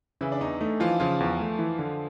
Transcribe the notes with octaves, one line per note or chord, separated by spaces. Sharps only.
C#3 E3 E4
D4
E2 D#4
A3 D#4
E3 F3 F4
C#3 F3 F4
E2
A3
E3
D3